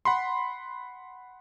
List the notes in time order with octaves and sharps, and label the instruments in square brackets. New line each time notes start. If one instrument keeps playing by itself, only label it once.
[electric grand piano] F#5 B5 C6